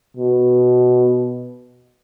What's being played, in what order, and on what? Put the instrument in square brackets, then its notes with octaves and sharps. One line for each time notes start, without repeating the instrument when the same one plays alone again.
[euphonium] B2